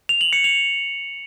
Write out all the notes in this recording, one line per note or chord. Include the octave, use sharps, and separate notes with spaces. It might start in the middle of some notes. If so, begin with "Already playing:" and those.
F7
F#7
C#7
F7